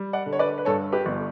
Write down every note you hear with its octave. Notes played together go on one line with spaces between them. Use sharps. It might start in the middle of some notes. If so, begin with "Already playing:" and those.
Already playing: G3
D5 F#5
D3
C#5
B4 D5
B4
G2 A4 C#5
G4 B4
G1